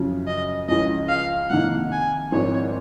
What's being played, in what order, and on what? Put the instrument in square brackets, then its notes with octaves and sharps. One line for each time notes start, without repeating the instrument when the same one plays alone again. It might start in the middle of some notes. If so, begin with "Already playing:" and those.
Already playing: [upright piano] F#2 C#3 F3
[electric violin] D#5
[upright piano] C#2 C#3 F3 [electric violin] D#5
[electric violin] F5
[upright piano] F2 C3 D#3 A#3 [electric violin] F#5
[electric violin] G#5
[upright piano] G#1 G#2 F3 C4 [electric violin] C#5